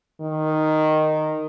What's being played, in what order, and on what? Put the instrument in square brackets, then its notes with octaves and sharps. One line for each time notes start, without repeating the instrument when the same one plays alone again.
[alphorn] D#3